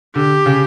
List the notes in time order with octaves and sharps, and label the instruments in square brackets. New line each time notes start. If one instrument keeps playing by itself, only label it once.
[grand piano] D3 [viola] G4
[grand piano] C#3